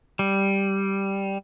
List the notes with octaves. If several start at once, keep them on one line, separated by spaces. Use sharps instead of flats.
G3